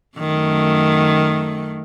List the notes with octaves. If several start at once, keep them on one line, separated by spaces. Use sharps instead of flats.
F#2 D#3 A3